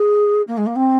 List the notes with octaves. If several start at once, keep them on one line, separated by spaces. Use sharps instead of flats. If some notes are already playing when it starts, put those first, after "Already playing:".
Already playing: G#4
A#3
G#3
A#3
C4